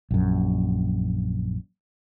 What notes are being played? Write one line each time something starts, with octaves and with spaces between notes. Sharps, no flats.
A#1 F#2